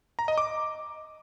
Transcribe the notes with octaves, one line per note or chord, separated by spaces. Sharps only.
A#5
D#5
D6